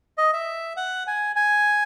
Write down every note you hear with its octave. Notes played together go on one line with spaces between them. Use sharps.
D#5
E5
F#5
G#5
G#5